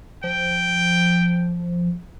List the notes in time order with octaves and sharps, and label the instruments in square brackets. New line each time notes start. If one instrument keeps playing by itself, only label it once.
[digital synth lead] F3 [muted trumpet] G5